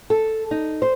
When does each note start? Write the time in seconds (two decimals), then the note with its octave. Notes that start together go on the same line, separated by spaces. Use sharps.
0.10 A4
0.51 D#4
0.82 C5